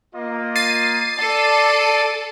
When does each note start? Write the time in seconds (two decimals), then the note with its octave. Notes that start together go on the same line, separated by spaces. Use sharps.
0.15 A#3 F4 D#5
0.55 A6 C7 D#7
1.18 A4 D5